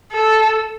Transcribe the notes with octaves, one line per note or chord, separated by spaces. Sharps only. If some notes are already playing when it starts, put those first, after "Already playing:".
A4